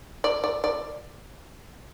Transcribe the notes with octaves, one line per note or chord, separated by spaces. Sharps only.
D5
D5
D5